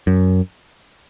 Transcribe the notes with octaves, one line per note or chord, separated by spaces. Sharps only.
F#2